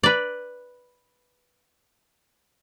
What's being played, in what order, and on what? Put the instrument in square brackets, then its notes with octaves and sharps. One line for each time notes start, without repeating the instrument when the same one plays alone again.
[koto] B4 D5